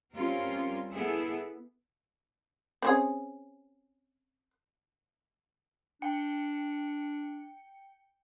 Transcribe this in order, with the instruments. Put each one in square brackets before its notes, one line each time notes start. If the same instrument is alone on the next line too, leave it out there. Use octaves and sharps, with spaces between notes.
[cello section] G3 C4 C#4 F4 A#4
B3 E4 G#4 A4 B4
[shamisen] C4 C#4 G#4
[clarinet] D4 [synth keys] G5 C#7